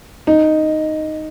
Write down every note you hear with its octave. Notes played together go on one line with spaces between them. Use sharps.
D#4